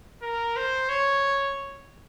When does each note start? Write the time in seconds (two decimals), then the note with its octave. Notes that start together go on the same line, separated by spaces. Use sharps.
0.22 A#4
0.56 C5
0.89 C#5